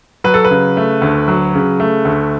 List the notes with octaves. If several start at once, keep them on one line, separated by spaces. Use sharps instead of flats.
F#3 B4
A4
B4
C#3
A3
D2
F#3
C#3
A3
D2